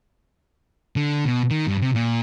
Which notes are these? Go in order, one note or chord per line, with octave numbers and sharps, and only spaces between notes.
D3
B2
D#3
G2
C3
A#2